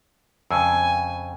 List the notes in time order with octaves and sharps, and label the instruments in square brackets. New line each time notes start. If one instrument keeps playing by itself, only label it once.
[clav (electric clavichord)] F2 C#3 [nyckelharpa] G#5 [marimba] A5 E6